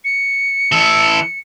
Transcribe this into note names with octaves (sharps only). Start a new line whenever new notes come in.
C#7
E3 A4